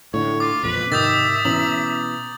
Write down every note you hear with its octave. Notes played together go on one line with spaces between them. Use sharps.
A2 D3 C#5
F4 D6
E1 A#1 F2 B4
G#2 C3 D#3 E5 D#6 G6 A6
B2 E3 C#4 A#5 F#7